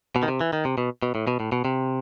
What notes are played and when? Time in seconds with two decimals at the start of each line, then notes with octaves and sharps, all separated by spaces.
0.16 B2
0.23 D#3
0.28 C3
0.41 E3
0.53 D#3
0.65 C3
0.78 B2
1.03 B2
1.15 A2
1.27 B2
1.40 A2
1.52 B2
1.65 C3